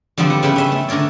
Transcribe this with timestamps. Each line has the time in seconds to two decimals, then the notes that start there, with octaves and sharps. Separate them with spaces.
0.18 D3 F3 G3 B3 C4 D4
0.30 F#5
0.43 C#3 E4 B4 G5 B5
0.56 C#4 E5 C6
0.72 A3
0.89 D3 D4 A#4 C#5 D5